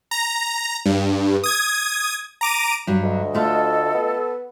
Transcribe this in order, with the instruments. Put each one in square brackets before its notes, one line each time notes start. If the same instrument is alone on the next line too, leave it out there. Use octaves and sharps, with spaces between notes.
[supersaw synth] A#5
G2
D#6 G#6
A#5 D6 D#7
[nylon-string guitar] G2 F#3 [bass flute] F#4
[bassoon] D2 [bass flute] D#5
[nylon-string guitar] A3 F4 [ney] A4
[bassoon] B3